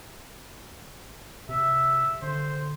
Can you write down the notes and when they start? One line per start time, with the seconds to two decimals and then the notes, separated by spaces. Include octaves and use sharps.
1.49 C3 E5
2.22 D3 C5